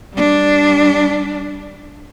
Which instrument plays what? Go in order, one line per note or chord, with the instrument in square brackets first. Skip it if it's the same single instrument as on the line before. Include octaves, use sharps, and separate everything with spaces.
[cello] G3 D4